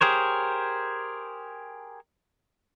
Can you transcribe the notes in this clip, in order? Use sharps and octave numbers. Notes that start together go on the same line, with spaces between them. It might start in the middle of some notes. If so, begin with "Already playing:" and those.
G4 G#4 A#4 C5 C#5